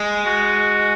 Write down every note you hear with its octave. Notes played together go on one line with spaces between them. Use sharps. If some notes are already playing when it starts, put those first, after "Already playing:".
Already playing: G#3
F#4